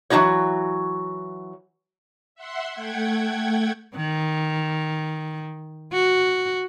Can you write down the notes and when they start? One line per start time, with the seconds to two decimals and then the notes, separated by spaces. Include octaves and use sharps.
0.10 E3 F#3 A3 D#4 F#4 C#5
2.35 E5 F#5 C6
2.74 A3 F#5 G5 G#6
3.96 D#3
5.93 F#4